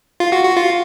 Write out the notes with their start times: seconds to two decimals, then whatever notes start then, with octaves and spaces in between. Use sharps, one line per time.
0.20 F4
0.32 F#4
0.44 F#4
0.57 F4